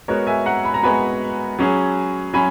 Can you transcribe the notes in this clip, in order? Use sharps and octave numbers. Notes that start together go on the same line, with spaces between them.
G#3 B3 F#4 A#4 C#5
E5 G#5
F#5 A#5
B5
A#5
G#3 B3 F#4 G#5 B5
F#3 C#4 G#4
F#3 C#4 G#5 B5